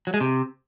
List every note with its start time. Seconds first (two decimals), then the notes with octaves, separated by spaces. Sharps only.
0.07 F#3
0.14 G#3
0.21 C3